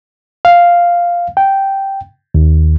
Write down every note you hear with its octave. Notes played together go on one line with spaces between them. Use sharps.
F5
G5
D#2